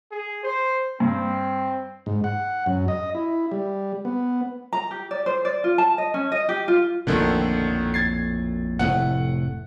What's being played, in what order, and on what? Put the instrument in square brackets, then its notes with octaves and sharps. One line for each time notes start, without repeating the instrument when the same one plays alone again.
[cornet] G#4
C5
[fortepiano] G2 [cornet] C4
[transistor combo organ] G#2
F#5
F#2
D#5
E4
G3
B3
[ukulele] A#5
G4
D5
C5
D5
F4
A5
D#5
C#4
D#5
G4
F4
[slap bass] A#1 F2 A2 [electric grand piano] D3 D#3 A3
[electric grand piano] G#6 A6 C7
[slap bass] F1 A2 A3 [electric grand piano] F#5